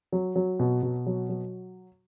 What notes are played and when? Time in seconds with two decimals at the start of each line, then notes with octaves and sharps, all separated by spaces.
0.12 F#3
0.36 F#3
0.59 B2
0.83 B2
1.06 F#3
1.29 F#3